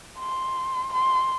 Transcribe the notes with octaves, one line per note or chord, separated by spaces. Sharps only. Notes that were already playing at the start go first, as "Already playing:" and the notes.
C6
C6